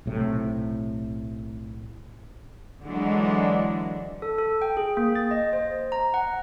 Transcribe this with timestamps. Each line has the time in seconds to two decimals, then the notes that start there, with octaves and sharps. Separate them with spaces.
0.06 B1 A2 C3
2.83 D3 E3 F#3 G#3 D4
4.22 A4
4.38 A4
4.62 G5
4.77 G#4
4.97 A#3
5.15 A6
5.31 D#5
5.53 C5
5.92 A#5
6.14 F#5